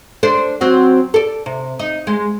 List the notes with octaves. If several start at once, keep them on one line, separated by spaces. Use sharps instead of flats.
D4 A4 C5
F#3 C4 F#4
A4 D5
C3
D#4
G#3